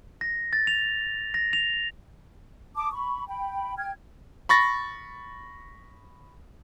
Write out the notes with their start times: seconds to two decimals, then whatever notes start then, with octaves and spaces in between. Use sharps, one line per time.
0.21 A#6
0.53 A6
0.67 F7
1.34 A#6
1.53 F7
2.76 A5 D6 D#6
2.93 B5 C#6
3.28 G5 B5
3.78 G5 F6 G#6
4.49 B5 C#6 A6 A#6